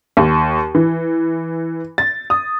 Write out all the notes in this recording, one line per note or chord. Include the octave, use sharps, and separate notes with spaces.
D#2
E3
A6
D#6